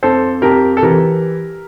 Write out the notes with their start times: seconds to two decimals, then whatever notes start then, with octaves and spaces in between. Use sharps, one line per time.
0.03 F2 A4 C5
0.42 F2 G4 A#4
0.77 A4
0.83 E3 G4 A#4